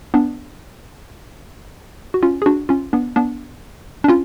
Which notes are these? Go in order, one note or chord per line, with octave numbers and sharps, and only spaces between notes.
B3 D4
F#4
C#4 F4
G#4
D4 F#4
C#4 F4
B3 D4
B3 D4
D4
C#4 F4